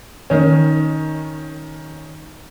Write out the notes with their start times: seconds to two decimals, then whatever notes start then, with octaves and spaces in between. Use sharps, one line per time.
0.30 D#3 C#4